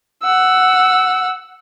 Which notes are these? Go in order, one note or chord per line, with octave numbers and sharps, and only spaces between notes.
F#5 E6